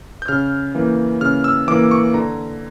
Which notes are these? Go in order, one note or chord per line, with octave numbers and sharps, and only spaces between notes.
G6
C#3 F6
E3 A#3
C#3 F6
E6
E3 A#3 D6
C#6
D3 A#5